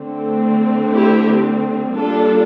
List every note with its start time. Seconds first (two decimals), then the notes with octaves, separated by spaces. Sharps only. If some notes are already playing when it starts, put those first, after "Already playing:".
Already playing: D3 A3 C4
0.93 E4 G4
1.95 G3 A#3 D4 F4 A4